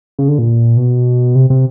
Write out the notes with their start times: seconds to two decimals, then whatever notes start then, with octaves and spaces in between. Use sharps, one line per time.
0.19 C#3
0.28 D3
0.39 A#2
0.77 B2
1.35 C3
1.50 C3